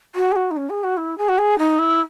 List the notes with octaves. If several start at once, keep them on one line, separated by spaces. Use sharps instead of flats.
F#4
G#4
F#4
D#4
C#4
G#4
F#4
E4
G#4
F#4
G#4
D#4
E4